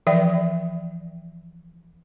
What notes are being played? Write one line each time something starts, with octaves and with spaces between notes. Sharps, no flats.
E3 F3 D5 E5 G5